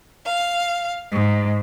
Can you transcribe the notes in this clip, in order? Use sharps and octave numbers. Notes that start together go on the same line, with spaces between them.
F5
G#2